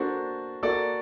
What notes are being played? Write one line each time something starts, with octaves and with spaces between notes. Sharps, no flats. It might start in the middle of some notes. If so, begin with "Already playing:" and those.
Already playing: A#3 D4 F#4 A4 C5
A#3 F#4 A4 D5